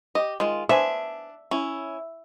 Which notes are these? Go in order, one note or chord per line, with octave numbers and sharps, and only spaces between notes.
G4 D#5
D#3 G#3 F4
B3 D4 C5 E5 G#5
C#4 E4